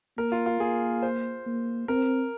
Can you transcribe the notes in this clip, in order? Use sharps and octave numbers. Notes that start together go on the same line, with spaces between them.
A#3 A#4
F4
F4
A#3 G#4
C5
A#3
C4 A#4